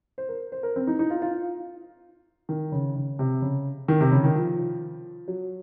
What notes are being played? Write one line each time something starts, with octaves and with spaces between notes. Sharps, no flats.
C5
A#4
C5
A#4
C4
D#4
D#4
F4
F4
D#3
C#3
C#3
C3
C#3
D#3
C3
C#3
D#3
F3
F#3